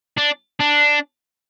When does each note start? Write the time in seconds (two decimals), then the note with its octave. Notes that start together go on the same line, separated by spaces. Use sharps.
0.17 D4
0.60 D4